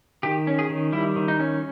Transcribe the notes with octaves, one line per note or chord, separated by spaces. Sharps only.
D#3 G4
C#4
G#4
D#3
G3 E4
D#3
D#4
C#4